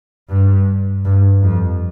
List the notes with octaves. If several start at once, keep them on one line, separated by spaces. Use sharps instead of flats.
G2
G2
F2